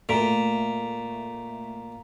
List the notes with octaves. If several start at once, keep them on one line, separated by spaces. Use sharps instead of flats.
A#2 A3 A#5 B6 F7